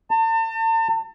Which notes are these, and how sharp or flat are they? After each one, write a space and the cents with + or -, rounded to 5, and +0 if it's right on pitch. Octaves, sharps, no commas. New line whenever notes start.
A5 +40